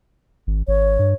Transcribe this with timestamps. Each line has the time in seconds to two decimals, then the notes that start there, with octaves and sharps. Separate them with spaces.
0.47 G#1
0.68 G#1 C#5
0.99 G2